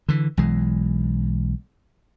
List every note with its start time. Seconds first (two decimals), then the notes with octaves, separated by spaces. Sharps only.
0.09 D3 E3
0.37 B1 E3 G#3